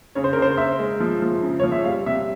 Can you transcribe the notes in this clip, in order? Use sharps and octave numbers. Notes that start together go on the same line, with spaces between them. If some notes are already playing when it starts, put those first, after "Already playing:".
C#3 C#5
C5
C#3 A#4
C5
C#3 E5
G#3
F3
F3
C#3
F3 C#5
E5
G3 F5
C3 E5